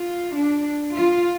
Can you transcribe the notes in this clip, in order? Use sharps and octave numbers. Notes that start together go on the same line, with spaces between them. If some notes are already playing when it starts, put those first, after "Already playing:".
Already playing: F4
D4
F4